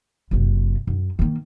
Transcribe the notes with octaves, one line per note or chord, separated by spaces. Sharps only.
F#1 C3
F#2
D#3 A#3